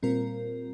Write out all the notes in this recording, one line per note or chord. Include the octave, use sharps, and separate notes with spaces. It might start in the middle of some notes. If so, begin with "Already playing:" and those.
A#2 G3 C4 F4 A#4